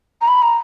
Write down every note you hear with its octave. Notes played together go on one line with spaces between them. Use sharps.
A#5
B5
A#5